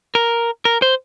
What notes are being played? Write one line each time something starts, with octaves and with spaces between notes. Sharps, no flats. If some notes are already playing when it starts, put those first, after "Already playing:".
A#4
A#4
C5